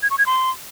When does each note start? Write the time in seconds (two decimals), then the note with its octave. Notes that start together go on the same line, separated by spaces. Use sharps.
0.03 G#6
0.11 C#6
0.18 G#6
0.26 C6